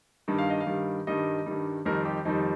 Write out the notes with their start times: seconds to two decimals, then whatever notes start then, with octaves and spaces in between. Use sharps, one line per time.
0.28 G2 D#3 G3
0.38 F5
0.50 D#5
0.61 F5
0.66 G2 D#3 G3
1.07 G2 D#3 G3 D#5
1.46 G2 D#3 G3
1.85 F2 D#3 G3 A#4
2.05 G4
2.25 F2 D#3 G3 D#4